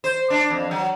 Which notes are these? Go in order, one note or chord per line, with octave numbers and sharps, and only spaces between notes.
C5
D4
F2
F#3